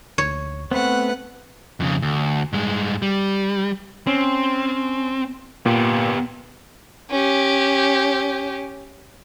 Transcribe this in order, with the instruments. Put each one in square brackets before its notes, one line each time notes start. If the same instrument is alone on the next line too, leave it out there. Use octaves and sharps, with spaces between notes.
[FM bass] D2 [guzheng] C#5
[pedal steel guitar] A3 B3 [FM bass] C4 [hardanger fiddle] B4 F#5
[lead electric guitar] F2 C#3
D2
G2 G#3
G3
[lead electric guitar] C4 [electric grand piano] C#4
[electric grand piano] A#2 [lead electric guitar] B3 G4
[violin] C#4 G4